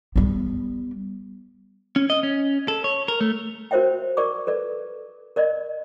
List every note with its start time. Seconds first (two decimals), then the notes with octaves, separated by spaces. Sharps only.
0.16 G3 B3
1.96 C#4
2.10 D#5
2.23 C#4
2.68 A4
2.84 C#5
3.08 A#4
3.21 A3
3.71 F#4 A#4 C5 C#5 E5 G5
4.17 A#4 D5 C#6 D6
4.47 A4 B4 D5
5.36 A#4 D5 D#5